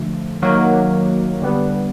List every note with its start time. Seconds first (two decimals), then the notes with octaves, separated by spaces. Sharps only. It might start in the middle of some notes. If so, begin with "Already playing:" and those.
Already playing: D3 F3 A3
0.42 D#3 F#3 A#3
1.42 D3 G3 B3